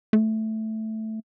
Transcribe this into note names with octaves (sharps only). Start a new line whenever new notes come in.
A3